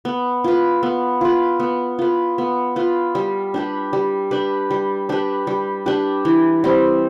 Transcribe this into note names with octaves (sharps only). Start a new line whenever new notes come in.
B3
F4 B4
B3
F4 B4
B3
F4 B4
B3
F4 B4
G3
D4 G4 B4
G3
D4 G4 B4
G3
D4 G4 B4
G3
D4 G4 B4
E3
G3 C4